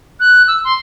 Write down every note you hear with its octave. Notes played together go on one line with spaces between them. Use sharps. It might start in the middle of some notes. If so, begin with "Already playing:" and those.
F#6
E6
C6